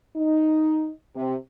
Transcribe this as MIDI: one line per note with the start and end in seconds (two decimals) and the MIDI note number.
0.16 0.90 63
1.15 1.34 48